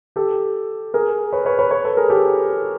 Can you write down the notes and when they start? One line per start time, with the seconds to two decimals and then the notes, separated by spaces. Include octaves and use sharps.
0.16 G4 A4
0.94 G#4 A#4
1.32 B4 C#5
1.45 B4 C#5
1.59 B4 C#5
1.71 B4 C#5
1.84 A4 B4
1.97 G#4 A#4
2.10 G4 A4